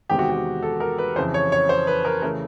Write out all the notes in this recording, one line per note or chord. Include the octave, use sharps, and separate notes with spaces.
E2 C3 D#3 G#3 C4 G4
F#4
G4
A4
A#4
B4
F2 C#3 E3 C5
C#5
C#5
C5
B4
A#4
C#3 E3 A3 A#4